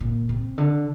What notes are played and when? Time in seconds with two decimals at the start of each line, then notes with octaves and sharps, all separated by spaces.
0.01 A#2
0.29 C3
0.58 D3